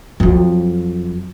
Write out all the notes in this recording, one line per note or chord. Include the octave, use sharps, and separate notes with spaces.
F2 F#3